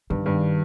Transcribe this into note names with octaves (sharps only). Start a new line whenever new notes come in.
G2 D#3
G2